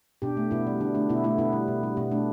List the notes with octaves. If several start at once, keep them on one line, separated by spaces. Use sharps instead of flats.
B2 D4 G4
A3
B2 B3 E4
G3
D3 D4
A3 D4
B2 B3 E4
A3 B3 E4
B2 B3 E4
G3
B2
G3
B2 B3
A3 D4